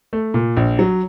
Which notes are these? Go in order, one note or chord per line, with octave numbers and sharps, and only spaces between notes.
A3
A#2
A#1
F#3